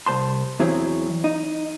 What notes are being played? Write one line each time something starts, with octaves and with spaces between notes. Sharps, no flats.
C2 C5 A5 C6
E2 F#3 C4 E4 G#4
D#4